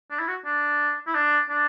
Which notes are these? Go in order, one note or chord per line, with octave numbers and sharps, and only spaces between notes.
D4
E4
F#4
D4
E4
D4
D4